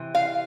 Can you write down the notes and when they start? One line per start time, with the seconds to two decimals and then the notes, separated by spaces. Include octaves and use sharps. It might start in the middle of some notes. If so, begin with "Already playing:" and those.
Already playing: C3 E3
0.15 F5